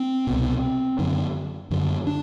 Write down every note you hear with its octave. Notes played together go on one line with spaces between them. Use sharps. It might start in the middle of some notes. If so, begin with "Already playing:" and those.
Already playing: C4
C2 B2
F#2 D3
F#2 D3
D4